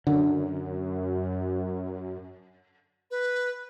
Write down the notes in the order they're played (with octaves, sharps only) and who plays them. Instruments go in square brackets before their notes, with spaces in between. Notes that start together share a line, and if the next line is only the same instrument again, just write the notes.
[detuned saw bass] F#2 [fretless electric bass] D3
[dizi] B4